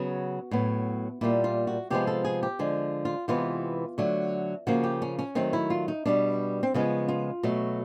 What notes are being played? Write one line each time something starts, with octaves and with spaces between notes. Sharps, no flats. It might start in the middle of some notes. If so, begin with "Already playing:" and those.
Already playing: C#3 F#3 B3 F#4
A2 F#3 B3
A#2 G3 A#3 E4
F4
F#4
C3 F3 G#3 B3 G4
A4
G#4
G4
D3 F3 G#3
F4
C3 E3 G#3 B3 F4
D3 F#3 A3
C#3 F3 A#3 F#4
G4
C#4
C#4
D#3 F#3 A3 C4
E4
F4
D#4
B2 G3 B3 D4
C4
C#3 F3 G#3 B3 C#4
F4
B2 F#3 A3 F#4